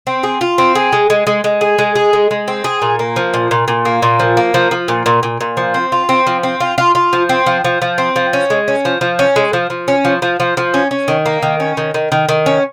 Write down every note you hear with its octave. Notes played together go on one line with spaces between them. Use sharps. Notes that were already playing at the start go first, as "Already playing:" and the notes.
C4
G#4
F4
C4
G#4
G#3
G#3
G#3
G#3
G#4
G#3
G#4
G#3
G#3
C4
G#4
A#2
A#3
F3
A#2
A#2
A#2
A#3
A#2
F3
A#3
F3
F3
A#2
A#2
A#2
A#2
F3
C4
F4
C4
F3
C4
F4
F4
F4
F3
C4
F3
F3
F3
C4
F3
C#4
G#3
C#4
F3
F3
C#4
G#3
F3
F3
C#4
F3
F3
F3
F3
C#4
C#4
D#3
A#3
D#3
C#4
D#3
D#3
D#3
D#3
C#4